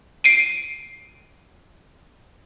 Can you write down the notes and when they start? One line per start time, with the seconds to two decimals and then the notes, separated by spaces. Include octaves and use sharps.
0.24 C7 D7 D#7